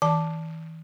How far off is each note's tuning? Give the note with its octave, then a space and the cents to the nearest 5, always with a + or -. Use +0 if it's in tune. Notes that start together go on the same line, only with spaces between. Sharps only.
E3 -40 A5 +0